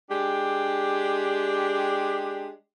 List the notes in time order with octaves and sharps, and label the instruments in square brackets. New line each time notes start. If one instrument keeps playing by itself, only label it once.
[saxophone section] G#3 D4 G4